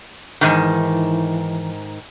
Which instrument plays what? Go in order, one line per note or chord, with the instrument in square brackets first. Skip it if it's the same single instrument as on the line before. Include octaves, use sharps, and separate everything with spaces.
[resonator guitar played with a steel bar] G#2 D#3 [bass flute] E3